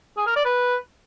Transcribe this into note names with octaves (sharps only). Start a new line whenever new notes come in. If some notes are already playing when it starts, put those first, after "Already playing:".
G#4
A#4
D5
B4